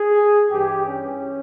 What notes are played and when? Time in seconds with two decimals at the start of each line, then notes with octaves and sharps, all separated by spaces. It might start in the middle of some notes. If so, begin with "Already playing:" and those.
Already playing: G#4
0.51 G2 E3 G4
0.86 C#4